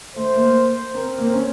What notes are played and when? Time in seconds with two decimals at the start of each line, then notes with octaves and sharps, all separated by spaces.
0.16 A3 C5
0.36 A#3
0.94 C4 A#4
1.18 A#3
1.26 C4
1.34 C#4